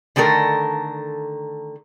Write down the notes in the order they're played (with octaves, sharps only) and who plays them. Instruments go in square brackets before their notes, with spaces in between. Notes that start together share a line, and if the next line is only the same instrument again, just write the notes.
[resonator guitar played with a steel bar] D3 D#3 A3 A4 A#4